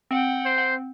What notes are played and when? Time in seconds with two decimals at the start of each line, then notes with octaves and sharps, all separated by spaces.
0.11 C4 F#5 G5
0.45 C5